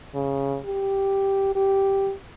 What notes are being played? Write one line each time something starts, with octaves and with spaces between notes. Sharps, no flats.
C#3
G4
G4